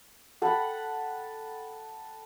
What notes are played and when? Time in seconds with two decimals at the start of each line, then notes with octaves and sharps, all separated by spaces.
0.42 A4 F#5 G5 B5